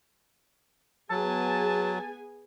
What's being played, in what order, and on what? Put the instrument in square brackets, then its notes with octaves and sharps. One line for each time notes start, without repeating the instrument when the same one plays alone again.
[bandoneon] F#3 [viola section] B3 G#4 G#5 [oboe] A5